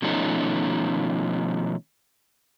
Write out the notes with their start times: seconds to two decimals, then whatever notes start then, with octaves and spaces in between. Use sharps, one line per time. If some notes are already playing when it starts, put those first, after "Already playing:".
0.02 B2 D#3 F3 A3 C#4 D#4